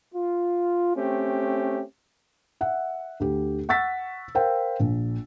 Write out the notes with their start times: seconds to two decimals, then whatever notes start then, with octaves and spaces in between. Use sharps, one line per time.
0.15 F4
0.96 A3 C4 C#4 G4
2.61 E5 F#5
3.20 D2 G4
3.69 F#5 C#6 E6 A6 B6
4.35 A#4 C5 F5 G5
4.80 A#1